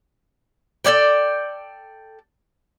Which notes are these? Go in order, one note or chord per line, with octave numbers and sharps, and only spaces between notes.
A4 C#5 D5 G5